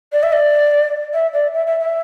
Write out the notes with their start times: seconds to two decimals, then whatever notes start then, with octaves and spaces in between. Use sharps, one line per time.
0.12 D5
0.23 E5
0.32 D5
1.13 E5
1.33 D5
1.53 E5
1.66 E5
1.80 E5